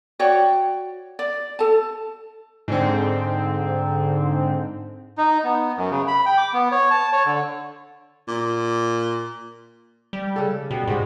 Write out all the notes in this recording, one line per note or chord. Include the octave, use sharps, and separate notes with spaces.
F#4 C#5 D5 G5
D5
A4 A5
G#2 D3 C4
D#4
B3
F#2
C#3
B5
G5
D6
B3
C#5
A5
C#5
D3
A#2
G3
C#3 A4
B2 G3
G#2 G#3 F#4 D5